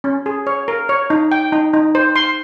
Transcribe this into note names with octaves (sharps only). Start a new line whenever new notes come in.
C#4
G#4
C#5
A#4
C#5
D#4
G5
D#4
D#4
C5
C6